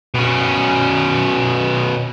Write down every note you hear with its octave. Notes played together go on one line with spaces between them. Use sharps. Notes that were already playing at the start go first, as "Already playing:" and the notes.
B2 C#4